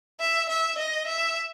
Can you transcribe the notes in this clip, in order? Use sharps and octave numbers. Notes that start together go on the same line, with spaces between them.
E5
E5
D#5
E5